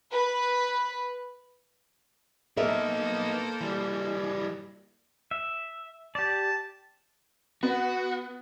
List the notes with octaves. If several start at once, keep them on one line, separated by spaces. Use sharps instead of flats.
B4
A#3 B3 D#4 A4 A#4 C5 E5
E3 G3
E5
G4 D5 A5
B3 F#4